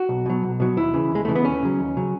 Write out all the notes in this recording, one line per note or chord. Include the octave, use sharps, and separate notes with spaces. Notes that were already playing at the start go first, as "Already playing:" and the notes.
Already playing: F#4
B1
B2 F#3
B1
B2 F#3
D#2 E4
C#3 E3
D#2 G#3
C#3 E3 A3
B3
D#2 C#4
C#3 F#3
D#2
C#3 F#3